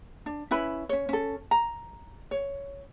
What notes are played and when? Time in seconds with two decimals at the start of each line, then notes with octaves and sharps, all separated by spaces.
0.26 D4
0.51 C#4 E4 B4 B5
0.89 C#4 C#5
1.09 C#4 A4
1.51 A#5
2.31 C#5